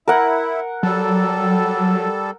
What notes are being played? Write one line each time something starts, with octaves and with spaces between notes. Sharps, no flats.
E4 A#4 F#5
F#3 G3 A4